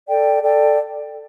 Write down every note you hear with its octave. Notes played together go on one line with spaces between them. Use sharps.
A4 D5 G5
A4 D5 G5